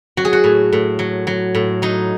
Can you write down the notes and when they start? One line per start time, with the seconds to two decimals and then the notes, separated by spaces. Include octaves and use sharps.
0.17 F#3 F#4
0.25 G#4
0.33 F#4
0.44 A2
0.73 A2
0.99 F#3
1.27 F#3
1.55 A2
1.82 F#3 D#4